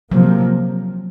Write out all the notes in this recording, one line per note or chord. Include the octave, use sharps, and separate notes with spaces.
C3 F3 F#3 A#3